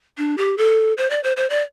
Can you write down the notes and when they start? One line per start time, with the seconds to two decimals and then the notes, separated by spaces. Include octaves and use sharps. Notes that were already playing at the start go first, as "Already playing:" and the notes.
0.18 D4
0.38 G4
0.58 A4
0.98 C5
1.10 D5
1.24 C5
1.37 C5
1.50 D5